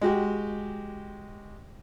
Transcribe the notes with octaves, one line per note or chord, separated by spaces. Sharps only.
G#3 F#4 G4